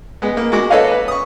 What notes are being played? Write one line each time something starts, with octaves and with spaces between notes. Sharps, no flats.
G#3 B3
A#3
G#3 F#4 D6
A4 B4 C#5 D#5 F5
B4
C#6 D#6